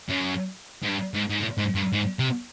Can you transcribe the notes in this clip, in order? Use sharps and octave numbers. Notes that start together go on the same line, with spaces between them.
F#2
G#2
G2
G#2
G#2
A2
G#2
G2
G#2
C3